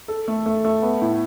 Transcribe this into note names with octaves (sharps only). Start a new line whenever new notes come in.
A4
A3
A3
A3
B3
A2